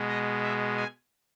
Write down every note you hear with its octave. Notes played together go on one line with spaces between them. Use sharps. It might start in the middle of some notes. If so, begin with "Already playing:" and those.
Already playing: B2 G#3
D#5
E5
G#5